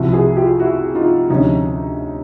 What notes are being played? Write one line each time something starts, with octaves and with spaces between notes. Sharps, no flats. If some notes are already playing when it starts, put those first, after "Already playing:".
Already playing: C2 C3 F3 E4 F#4
F#4 G#4
F4 G4
E4 F#4
D#4 F4
D2 C3 F3 C#4 D#4